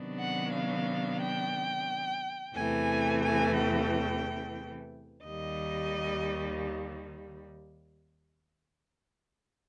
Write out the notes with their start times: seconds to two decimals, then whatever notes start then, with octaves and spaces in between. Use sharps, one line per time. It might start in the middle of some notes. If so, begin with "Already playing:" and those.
Already playing: C3 D#3 F#3 B3 D4
0.19 F#5
0.53 F5
1.21 G5
2.54 E2 C3 E3 A3 G#5
3.22 G#5
3.56 G5
5.24 D#2 D#3 G3 D#5